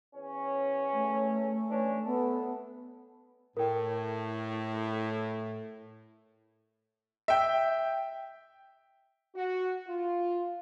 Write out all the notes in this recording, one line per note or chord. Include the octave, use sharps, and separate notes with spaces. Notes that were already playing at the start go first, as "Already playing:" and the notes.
E2 C#4
A3
E3 C#4 D4
A3 B3 A4
A2 A#4 G5
E5 G5
F#4
F4